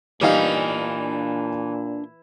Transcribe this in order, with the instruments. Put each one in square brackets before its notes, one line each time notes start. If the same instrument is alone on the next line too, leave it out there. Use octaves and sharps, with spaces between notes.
[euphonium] A#2 [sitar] E3 [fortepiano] G3 D#4 F5 [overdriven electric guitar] D4 G#5